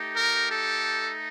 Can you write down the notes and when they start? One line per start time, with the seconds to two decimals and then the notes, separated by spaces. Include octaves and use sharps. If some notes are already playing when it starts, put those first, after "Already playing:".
Already playing: A3 D#4 G4
0.16 A#4
0.51 A4